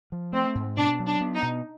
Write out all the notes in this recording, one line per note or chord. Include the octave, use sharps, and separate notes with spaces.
F3
A3 C4
G#2
B2 D4
F#3
D4
B3
D#4
B2